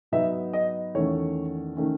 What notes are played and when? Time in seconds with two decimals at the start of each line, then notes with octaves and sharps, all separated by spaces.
0.12 G#2 F#3 B3 D#4 E5
0.53 D#5
0.95 E2 D#3 A3 C#4 C#5
1.77 D#3 A3 C#4